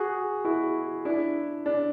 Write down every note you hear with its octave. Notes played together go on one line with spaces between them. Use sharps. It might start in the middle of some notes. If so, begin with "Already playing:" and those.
Already playing: F#4 G#4
E4 F#4
D4 E4
D4